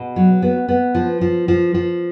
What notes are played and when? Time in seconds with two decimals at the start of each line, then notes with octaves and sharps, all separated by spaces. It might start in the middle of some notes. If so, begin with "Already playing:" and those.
Already playing: B2
0.16 F#3
0.42 B3
0.69 B3
0.95 F3
1.21 F3
1.48 F3
1.74 F3